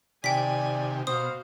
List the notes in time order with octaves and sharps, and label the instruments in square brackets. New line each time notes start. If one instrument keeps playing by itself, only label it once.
[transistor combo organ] C3 D#3 G4 [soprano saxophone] D5 [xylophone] G5 B6 [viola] G#5
[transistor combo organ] B2 [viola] F#4 F5 [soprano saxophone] C5 [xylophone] D#6